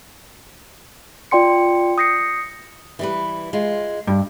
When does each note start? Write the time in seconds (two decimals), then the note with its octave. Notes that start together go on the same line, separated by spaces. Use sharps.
1.31 F4 D5 G5 C6 C#7
1.98 D#6 G6 A#6 C7 C#7
2.99 E3 G3 B4
3.53 G#3 F4
4.07 G2